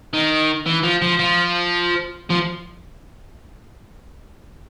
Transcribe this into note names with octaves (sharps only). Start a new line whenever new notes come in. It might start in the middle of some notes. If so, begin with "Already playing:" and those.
D#3
E3
F3
F3
F3
F3